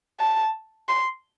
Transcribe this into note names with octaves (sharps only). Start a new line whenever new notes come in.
A5
C6